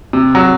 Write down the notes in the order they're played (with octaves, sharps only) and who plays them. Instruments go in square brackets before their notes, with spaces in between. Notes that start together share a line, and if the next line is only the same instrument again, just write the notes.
[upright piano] C3
F#3